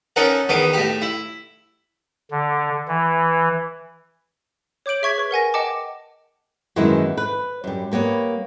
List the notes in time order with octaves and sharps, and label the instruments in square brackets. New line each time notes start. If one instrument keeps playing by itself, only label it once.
[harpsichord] C#4 D#4 A4 A#4 F#5
E2 D#3 B3 D6 D#6
A2 G4
E4
[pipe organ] D3
E3
[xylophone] C#5 D6 G6 D7 F#7
G#4 E5 C#6 G#6 B6
B4 C#6
A#4 F#5 G#5 A#6
D#5 F#5 G5 A5 D6
[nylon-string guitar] F#2 D#3 E3 G#3 B3 E4
B4
F#2 G3
G3 A#3 B3 C#5